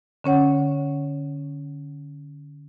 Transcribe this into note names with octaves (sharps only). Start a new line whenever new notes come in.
D3 C#4 C#5 F#5